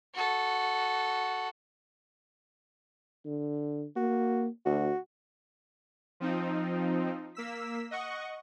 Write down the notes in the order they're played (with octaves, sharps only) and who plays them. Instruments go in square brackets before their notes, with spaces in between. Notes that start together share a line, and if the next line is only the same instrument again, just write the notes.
[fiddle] F#4 A4
[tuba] D3
[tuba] A#3 [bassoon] F#4
[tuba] D2 [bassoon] F#4
[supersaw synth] F3 C4 D#4
A#3 E6 B6
D#5 F#5 C#6